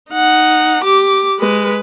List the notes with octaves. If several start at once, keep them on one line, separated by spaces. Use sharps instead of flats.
D#4 F#5
G4 D6
G#3 B4